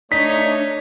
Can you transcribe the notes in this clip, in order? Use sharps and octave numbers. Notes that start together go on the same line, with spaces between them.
A3 D4 D#4 C#5 B6